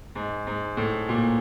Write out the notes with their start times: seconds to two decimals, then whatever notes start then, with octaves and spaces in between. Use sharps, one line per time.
0.15 G#2
0.47 G#2
0.77 A2
1.09 A#2